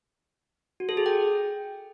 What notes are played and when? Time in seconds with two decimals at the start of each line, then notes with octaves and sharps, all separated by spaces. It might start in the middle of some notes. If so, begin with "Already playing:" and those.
0.80 F#4
0.89 A4
0.97 G#4
1.06 G5